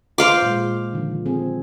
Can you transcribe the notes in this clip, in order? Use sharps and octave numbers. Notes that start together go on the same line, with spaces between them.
F4 C5 F5 D6
A#2 G#3
D3 D#3 F3
C4 G#4